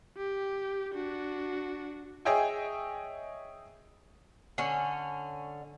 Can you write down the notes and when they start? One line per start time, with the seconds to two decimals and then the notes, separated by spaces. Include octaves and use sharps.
0.17 G4
0.93 D4 F#4
2.25 G#4 C#5 D#5 E5 G5 G#5
4.58 D3 C#4